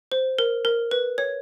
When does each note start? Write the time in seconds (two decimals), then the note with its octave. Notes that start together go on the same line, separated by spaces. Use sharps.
0.12 C5
0.39 A#4
0.65 A#4
0.91 B4
1.18 C#5